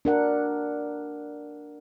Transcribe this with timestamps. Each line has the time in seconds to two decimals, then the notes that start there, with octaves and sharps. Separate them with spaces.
0.05 D4 A#4 F#5